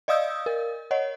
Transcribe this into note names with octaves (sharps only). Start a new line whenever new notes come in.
D5 D#5 F5 D#6 E6 G6
A#4
C#5 D#5 F#5